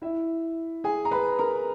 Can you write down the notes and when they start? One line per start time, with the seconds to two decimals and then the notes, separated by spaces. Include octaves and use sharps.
0.02 E4 E5
0.84 G#4 G#5
1.05 A#5
1.11 B4 B5
1.39 A#4 A#5